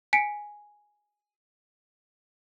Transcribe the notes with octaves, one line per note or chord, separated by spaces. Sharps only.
G#5 B6 C#7 D7